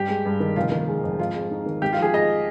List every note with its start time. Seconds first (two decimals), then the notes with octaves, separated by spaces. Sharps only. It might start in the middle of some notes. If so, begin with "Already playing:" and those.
Already playing: G2 G4
0.09 G#3
0.25 G2
0.40 D#3
0.56 F1 F4
0.72 D#3
0.88 G#3
1.03 F2
1.19 G#2 F4
1.35 G#3
1.51 D#4
1.66 D#3
1.81 G#1 G4
1.93 F4
1.97 F3
2.02 G#4
2.13 G#3 D#5